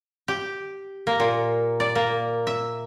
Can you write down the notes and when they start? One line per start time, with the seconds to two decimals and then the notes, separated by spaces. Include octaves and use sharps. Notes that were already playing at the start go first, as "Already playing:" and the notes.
0.28 G4
1.07 A#3
1.20 A#2
1.80 D5
1.95 A#3
2.47 E5